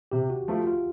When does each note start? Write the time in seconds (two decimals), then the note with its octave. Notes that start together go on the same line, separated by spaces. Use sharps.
0.12 C3 G4
0.30 F#4
0.48 F3 A3 F4
0.67 F4